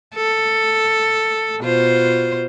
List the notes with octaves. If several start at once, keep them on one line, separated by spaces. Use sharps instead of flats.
A4
B2 F4 C5